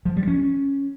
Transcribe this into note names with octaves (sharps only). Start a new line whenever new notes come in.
F3
G3
C#4